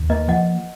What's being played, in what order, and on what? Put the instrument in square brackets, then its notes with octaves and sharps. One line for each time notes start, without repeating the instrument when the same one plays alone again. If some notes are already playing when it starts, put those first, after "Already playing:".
Already playing: [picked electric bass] D#2
[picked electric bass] A#3 [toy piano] B4 D#5
[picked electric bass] F3 [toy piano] D#5 F#5